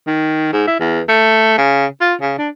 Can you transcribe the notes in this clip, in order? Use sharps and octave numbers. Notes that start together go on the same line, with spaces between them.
D#3
G#2
E4
E2
A3
C#3
F4
C#3
D4